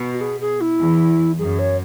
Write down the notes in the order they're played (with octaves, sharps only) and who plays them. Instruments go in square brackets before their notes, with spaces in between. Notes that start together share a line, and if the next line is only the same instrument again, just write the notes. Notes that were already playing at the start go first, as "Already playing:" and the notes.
Already playing: [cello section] B2
[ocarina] F#4
G#4
G#4
E4
[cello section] E2
[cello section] F#2 [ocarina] G#4
[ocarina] C#5